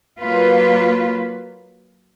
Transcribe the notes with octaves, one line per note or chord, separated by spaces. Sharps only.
F#3 A#3 F4 B4